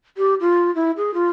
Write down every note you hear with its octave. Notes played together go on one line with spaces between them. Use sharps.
G4
F4
E4
G#4
F4